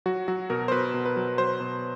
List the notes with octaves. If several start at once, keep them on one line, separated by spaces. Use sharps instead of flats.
F#3 F#4
F#3 F#4
B2 A#4
C5
B2 B4
B2
B4
F#3
F#3 C5
B2